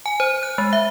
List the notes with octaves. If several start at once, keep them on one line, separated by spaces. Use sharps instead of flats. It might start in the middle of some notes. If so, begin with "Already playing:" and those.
G#5
C5
F#6
G#3
E5